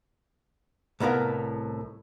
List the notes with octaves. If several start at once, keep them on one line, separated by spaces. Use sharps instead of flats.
C2 A2 B3 A#4 F5